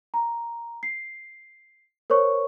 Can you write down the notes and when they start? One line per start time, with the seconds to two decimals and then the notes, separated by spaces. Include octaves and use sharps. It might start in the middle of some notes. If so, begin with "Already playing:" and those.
0.14 A#5
0.83 C7
2.10 A#4 C5 C#5 C#6